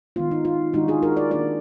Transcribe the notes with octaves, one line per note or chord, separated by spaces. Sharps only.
D#3 G#3 B3 F4
D#4
F4
D#3 G#3 D4 D#4 F#4
F4 G#4
F#4 A#4
A#4 D5
D#3 A#3 D4 A#4 D5